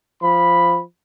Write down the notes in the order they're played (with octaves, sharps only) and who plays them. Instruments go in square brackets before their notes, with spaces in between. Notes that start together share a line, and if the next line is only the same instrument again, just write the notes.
[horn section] F3 B5